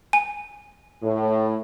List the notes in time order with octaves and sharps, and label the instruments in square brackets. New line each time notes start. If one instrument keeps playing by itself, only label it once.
[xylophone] G#5
[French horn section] A2